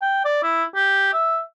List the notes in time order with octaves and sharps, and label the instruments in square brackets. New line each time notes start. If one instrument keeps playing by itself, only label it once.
[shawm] G5
D5
E4
G4
E5